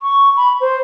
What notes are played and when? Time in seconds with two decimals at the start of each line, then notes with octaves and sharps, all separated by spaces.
0.03 C#6
0.37 B5
0.61 C5